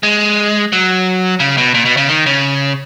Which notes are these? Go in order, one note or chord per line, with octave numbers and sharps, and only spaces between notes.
G#3
F#3
C#3
B2
A#2
B2
C#3
D#3
C#3